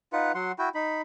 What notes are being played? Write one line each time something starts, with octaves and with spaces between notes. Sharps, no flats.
D#4 F4 B4 F#5
F#3 F#5 C6
E4 F#4 G5
D#4 B5